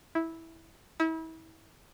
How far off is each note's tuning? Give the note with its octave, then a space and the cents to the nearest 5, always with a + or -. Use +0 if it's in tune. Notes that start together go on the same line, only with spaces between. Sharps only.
E4 -10
E4 -35